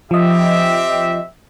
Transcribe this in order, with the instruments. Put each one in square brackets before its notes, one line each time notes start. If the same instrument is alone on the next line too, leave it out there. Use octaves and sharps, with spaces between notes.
[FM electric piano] F3 D#5 [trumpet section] C4 G4 E5